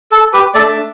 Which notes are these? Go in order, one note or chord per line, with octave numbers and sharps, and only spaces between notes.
A4
G4 B4
A3 D4 A4 D5